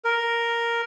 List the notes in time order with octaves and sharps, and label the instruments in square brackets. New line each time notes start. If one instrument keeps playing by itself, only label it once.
[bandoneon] A#4